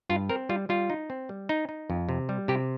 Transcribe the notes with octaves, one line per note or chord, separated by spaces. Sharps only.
G2 F4
C4 A#4
G3 F4
G3 F4
D#4
C4
G3
D#4
D#4
F2
C3
G3
C3 G4